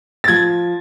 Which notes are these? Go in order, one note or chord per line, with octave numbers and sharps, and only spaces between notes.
A6
F3 G#6